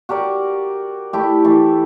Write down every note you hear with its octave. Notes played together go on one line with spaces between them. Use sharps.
F#4 G4 A#4 D5
A3 E4 G4
E3 A3